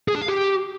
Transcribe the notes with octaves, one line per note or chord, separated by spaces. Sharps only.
G#4
D4
F5
G4